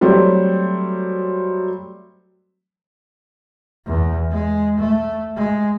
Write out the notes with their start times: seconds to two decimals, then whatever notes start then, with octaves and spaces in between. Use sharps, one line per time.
0.01 F#3 G3 A3 C4
3.86 E2
4.31 G#3
4.79 A3
5.36 G#3